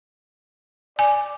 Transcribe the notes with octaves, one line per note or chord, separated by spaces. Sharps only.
D5 G#5